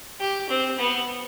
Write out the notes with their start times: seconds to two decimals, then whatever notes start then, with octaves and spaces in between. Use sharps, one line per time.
0.20 G4
0.49 C4
0.79 B3